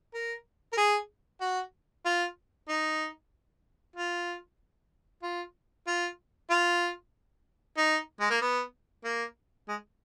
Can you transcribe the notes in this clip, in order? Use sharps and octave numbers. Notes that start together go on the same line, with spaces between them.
A#4
A#4
G#4
F#4
F4
D#4
F4
F4
F4
F4
D#4
G#3
A#3
B3
A#3
G#3